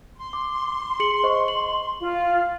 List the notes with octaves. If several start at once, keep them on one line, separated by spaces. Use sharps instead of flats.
C6
D6
G#4 C#7 F#7
C5 D#5 C#6
F#7
F4